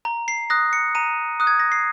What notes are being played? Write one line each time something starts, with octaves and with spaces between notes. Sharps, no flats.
A#5
C7
D#6 F#6 A#6
C#7
A#5 D#7
D#6 F#6
G#6
A#6
C7